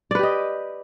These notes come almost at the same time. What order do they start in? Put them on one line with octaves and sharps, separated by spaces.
D5 B4 G4 D#5